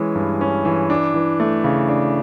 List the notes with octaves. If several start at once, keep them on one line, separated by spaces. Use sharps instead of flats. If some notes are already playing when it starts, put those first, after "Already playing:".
Already playing: E3 G#3 C#4
G2
C#4
E3
D4
E3
A3
C#3
D4